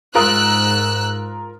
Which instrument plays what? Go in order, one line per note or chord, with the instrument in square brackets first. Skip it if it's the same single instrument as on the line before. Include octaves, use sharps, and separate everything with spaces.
[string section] G#2 E6 F#6 [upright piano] F4 A#4 D#6